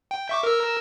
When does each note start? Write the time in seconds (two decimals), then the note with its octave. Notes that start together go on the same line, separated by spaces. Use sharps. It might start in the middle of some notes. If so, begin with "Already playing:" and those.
0.11 G5
0.29 E5 C#6 D6
0.43 A#4 E6